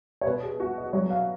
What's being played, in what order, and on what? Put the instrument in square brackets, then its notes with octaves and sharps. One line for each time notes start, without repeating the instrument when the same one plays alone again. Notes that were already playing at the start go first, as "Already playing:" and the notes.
[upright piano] C#5
[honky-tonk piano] B2 [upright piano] B4
[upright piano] G#4
[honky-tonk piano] F#4 [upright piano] F#5
[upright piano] D#5
[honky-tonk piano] F#3 [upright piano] C#5
[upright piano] F5